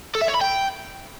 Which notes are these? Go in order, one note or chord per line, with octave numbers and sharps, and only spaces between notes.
A4
E5
C#5
B5
G5